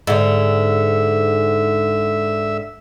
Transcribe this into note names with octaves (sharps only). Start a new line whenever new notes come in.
G#2 D3 E5